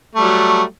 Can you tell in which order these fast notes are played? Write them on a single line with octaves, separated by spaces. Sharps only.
A3 G3 F#3